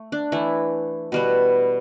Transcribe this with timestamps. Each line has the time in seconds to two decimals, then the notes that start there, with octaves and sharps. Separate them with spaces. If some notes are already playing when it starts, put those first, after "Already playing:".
Already playing: A3
0.12 D4
0.32 E3 A3 E4
1.12 B2 G3 B3